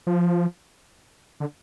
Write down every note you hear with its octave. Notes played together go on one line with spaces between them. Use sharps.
F3
D3